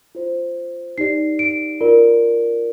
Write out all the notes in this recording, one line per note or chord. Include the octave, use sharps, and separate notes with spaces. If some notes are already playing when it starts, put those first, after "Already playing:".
F4 C5
D#4 G4 D5 C7
D7
F4 A#4 D5